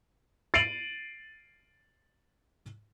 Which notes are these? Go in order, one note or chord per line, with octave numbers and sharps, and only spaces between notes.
A6 C7 D7 D#7 F7 F#7